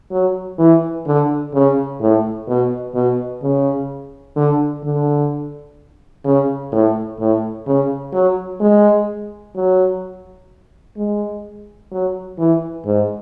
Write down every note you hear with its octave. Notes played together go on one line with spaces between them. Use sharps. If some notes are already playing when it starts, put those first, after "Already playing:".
F#3
E3
D3
C#3
A2
B2
B2
C#3
D3
D3
C#3
A2
A2
C#3
F#3
G#3
F#3
G#3
F#3
E3
G#2